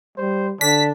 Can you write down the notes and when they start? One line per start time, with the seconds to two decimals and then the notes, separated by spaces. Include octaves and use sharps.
0.18 G3 C5
0.61 D3 D4 B6